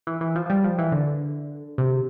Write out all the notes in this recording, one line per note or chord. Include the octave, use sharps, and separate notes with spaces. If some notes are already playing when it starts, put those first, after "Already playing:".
E3
E3
F3
F3
G3
F3
E3
D3
C3